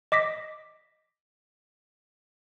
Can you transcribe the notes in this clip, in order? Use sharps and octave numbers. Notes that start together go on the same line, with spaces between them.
D#5 D6 A#6 B6